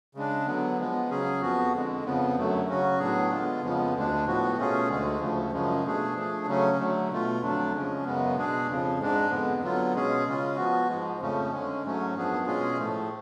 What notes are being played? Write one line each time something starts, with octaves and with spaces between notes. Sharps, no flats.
C#3 G#3 D4
D3 F#3 B3
F3 G#3 B3
C#3 F#3 C#4 G#4
F2 F3 B3 F#4
F2 D3 G#3
F2 C#3 F3 B3
F#2 D3 F#3 A3
C#3 F#3 C#4 F#4
A2 F#3 B3 D4 G#4
D3 G#3 B3 F4
F2 C#3 F3 G#3 B3
D2 D3 G#3 D4
A2 F3 B3 F#4
B2 A3 C#4 F4 G#4
D2 D3 G#3
D2 C#3 F3 A3
F#2 C#3 F3 G#3
B2 A3 D4 G#4
F3 A3 D4 G#4
C#3 F#3 A3 C#4
D3 F#3 A3
B2 A3 F4
F2 D3 F#3 A3 D4
C#3 F3 G#3 C#4
F#2 C#3 G#3 B3
B2 G#3 D4 G#4
F2 C#3 F3
G#2 G#3 D4
F2 D3 G#3 B3
D3 F#3 B3 F4
B2 G#3 C#4 G#4
C#3 G#3 C#4 F4
F3 B3 F#4
G#2 F3 G#3
F2 C#3 F3 A3 C#4
D3 G#3 C#4
G#2 F#3 A3 C#4
F#2 F3 B3 D4 G#4
B2 G#3 C#4 F4 G#4
A2 F3 A3